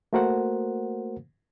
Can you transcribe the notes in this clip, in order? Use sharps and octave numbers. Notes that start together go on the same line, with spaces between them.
A3 A#3 F#4 A#4 C5 F#5